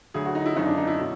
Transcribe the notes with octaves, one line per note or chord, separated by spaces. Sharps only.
D2 D3 F#3 G#4
F#4
D#4
E4
G#1 F#2 D3 D#4
D4
D#4
E4
B2 F#3